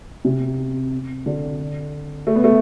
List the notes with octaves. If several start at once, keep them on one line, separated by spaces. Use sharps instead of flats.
C3
D3
A3
B3
A3